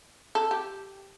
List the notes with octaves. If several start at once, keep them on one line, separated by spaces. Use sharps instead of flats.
A4
G4